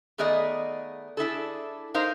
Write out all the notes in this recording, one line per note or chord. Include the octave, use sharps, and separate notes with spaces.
D#3 A3 B3 G#4 D5 D#5
D4 E4 G#4 A4
D#4 A#4 C5 F5